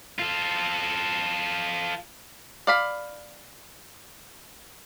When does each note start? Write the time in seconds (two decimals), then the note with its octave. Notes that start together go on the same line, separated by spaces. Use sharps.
0.20 F4 A4
2.67 D5 F5 B5